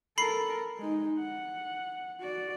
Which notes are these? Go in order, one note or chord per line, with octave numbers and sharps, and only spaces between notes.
A4 A#4 B5 C7
G#3 D#4
F#5
F#4 D5